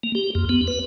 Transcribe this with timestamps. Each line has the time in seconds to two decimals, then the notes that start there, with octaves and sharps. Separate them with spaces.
0.03 A#3
0.15 G4
0.35 F2
0.49 B3
0.68 B4